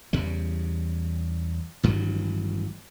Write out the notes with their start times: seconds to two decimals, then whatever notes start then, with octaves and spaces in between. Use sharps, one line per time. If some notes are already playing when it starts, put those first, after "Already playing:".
0.13 E2 C#3 G3
1.83 A1 G2 D#3 F#3